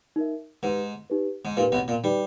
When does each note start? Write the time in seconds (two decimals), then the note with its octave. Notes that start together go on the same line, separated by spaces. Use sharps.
0.16 D#4 A#4 E5
0.63 G#2 D#4 G4 B4
1.10 D#4 G4 B4
1.45 G#2
1.57 A#2 D#4 G4 B4
1.72 B1 B2
1.88 A#2
2.04 G3 D#4 G4 B4